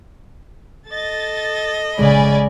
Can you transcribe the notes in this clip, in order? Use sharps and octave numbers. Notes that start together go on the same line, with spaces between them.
A4 D#5 A6
A#1 C#3 G#3 D5 G#5 B5